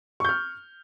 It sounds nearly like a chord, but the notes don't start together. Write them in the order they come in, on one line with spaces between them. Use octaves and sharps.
C#6 G6 F6